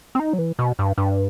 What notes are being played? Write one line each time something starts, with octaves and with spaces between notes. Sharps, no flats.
C4
D#4
F#3
E3
B2
G2
G2